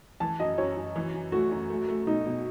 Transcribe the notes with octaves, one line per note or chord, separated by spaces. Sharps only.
E3 A5
F#2 D#5
F#2 C#5
F#2
E3
F#2
A3 F#4
F#2
A3
A3
B2 D#4
B2